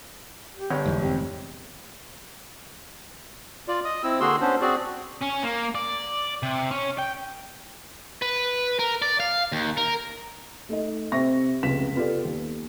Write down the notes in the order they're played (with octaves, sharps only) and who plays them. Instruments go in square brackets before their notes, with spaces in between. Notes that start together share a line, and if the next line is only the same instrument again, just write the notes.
[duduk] G4
[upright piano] G1 C#5
[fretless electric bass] F1 E2 G#2
[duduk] C4
[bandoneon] F4 D5
D#5 D#6
C4 E4 E6
D3 A#3 F#4 G#4 C6 E6
B3 C#4 D4 C5
C4 F#4 G#4 D5
[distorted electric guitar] C#4
A#3
D5
C3
C#4
G5
B4
A#4
D5
F5
D#2
A#4
[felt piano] A3 D#4 D#5
C3 C4 G4 E5 C#6 A#6
F1 C#2 B3 B6 E7
B3 F4 G4 A4 D5
D#2